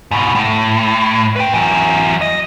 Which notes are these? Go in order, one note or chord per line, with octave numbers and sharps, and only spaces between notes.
G#2 B2
A2
B4 G5
E3 F#3
D#5